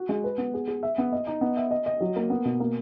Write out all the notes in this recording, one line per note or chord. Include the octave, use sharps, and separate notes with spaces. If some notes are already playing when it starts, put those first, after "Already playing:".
Already playing: F#4
G#3
B4
B3
G#4
G#4
E5
B3
D#5
D#4
B3
E5
D#5
D#5
F#3
A#3
B3
B2
A#3